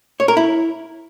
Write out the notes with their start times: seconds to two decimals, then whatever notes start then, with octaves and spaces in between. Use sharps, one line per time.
0.20 C#5
0.28 A#4
0.37 E4